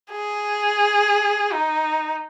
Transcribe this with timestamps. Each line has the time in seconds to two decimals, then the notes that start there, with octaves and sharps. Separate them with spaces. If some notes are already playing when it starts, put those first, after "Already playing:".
0.11 G#4
1.53 D#4